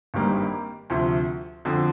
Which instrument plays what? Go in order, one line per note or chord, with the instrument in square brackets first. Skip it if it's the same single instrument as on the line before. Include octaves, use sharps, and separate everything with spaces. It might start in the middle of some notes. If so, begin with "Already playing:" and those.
[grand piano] G#1 G2 D#3 G3 A#3
D2 C3 F3
F2 D3 F3